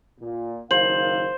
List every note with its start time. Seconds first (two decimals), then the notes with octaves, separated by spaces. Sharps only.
0.20 A#2
0.71 F#1 D#3 C5 F5 F#7